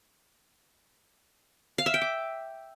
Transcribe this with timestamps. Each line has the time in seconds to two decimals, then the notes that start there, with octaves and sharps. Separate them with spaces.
1.78 F5
1.86 E5
1.94 G5
2.02 D6